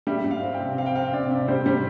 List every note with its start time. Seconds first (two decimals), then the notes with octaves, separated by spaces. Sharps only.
0.07 G3 E5
0.24 G3
0.31 F5
0.42 C4
0.54 G5
0.60 C3
0.77 C4 F5
0.86 G5
0.95 C4 F5
1.13 C3 D5
1.31 C3
1.48 G3 C5
1.66 G3 C5